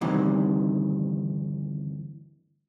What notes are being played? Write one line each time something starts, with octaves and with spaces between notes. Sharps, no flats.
D2 G2 C3 D#3 E3